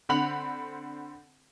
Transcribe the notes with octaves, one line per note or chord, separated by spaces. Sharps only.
D3 C4 F#5 B5 F7 F#7